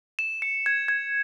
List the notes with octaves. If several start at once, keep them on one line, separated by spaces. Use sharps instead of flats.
E7
C#7
G#6
G#6